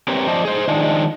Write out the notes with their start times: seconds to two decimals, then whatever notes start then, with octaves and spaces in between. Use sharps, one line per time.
0.08 C4 G4 A#4 B4 C#5
0.27 F3 C5 D5 D#5 A5
0.45 G#4 C5
0.68 D#3 F3 G#3 D4